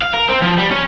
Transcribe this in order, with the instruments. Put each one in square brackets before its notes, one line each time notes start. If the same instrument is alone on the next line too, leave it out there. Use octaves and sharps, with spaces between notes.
[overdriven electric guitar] F5
A#4
C4
F3
G3
C#4